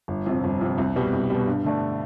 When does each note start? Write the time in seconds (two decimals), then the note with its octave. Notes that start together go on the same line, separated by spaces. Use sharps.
0.08 G1
0.26 F2 C3
0.44 G1
0.61 F2 C3
0.78 C2
0.96 B2 G3
1.12 C2
1.30 B2 G3
1.47 G2
1.65 D3 A3 D4